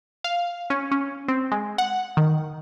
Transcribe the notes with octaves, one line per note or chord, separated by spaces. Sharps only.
F5
C#4
C#4
C4
G#3
F#5
D#3